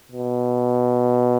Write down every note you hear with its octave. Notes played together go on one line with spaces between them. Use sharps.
B2